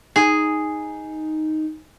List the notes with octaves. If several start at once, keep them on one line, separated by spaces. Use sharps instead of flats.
D#4 G#4